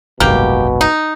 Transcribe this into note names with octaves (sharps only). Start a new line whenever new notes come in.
F#1 C2 G#2 B2 A#3 G4
D#4